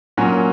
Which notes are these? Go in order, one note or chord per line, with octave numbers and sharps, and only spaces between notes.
A#2 F#3 C#4 F#4 A#4